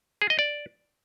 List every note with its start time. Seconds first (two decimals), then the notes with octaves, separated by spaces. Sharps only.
0.22 G#4
0.30 D#5
0.39 D5